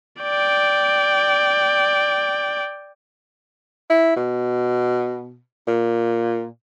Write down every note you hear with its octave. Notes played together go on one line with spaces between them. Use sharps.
D5 G5
E4
B2
A#2